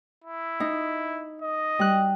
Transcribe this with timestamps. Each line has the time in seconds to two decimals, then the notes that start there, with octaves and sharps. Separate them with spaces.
0.24 E4
0.60 D#4
1.42 D#5
1.79 G3 F#6